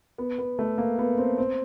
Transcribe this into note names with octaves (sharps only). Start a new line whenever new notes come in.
B3
B3
A3
A#3
B3
C4
C4